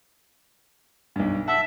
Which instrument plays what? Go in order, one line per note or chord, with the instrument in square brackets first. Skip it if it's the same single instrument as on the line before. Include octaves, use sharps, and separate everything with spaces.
[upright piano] B1 G2
[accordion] E5 [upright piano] F#5 A5